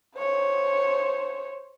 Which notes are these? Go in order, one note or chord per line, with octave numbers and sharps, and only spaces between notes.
C5 C#5